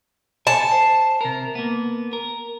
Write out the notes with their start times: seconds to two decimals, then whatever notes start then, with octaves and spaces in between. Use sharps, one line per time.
0.47 A4 G#5 A5
0.71 C5
1.21 C3 A#4
1.55 A#3 B3
2.13 A#4